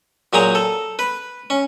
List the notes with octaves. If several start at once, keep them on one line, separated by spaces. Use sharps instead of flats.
A#2 F#3 G#4 G5 A#5
A4
B4
C#4